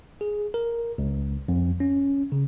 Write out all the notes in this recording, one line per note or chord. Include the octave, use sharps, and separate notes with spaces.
G#4
A#4
C#2
F2
C#4
C#3